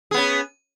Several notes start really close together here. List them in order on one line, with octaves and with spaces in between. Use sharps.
G#4 B3 C#4